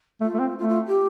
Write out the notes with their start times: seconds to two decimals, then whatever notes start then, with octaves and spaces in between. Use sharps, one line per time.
0.21 A3 F4
0.34 A3
0.40 C4
0.58 A3 F4
0.68 F4
0.87 G4